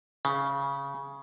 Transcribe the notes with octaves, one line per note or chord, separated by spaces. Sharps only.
C#3